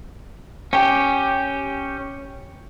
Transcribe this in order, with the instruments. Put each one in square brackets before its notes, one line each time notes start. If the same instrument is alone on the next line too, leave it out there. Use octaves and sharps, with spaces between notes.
[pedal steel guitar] C#4 G4 [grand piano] G5